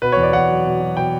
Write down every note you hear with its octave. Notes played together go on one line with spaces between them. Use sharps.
B2 B4
E2 C#5
D5
E2 F#5
F#3
B2
F#3
B2 G5